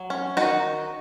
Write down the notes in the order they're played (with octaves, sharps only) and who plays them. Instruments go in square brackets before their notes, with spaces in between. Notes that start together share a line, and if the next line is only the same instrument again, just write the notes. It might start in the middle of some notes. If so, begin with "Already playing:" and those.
Already playing: [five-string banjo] F#3
C#4
D#3 D#4 F#4